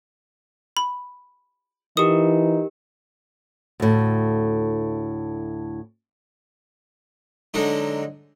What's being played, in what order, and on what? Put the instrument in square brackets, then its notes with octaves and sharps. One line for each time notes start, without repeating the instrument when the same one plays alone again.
[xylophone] B5
[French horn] E3 [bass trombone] D#4 [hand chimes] G4 A#4 [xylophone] D#6
[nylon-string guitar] D2 A2
[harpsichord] D3 F#3 G#3 D#4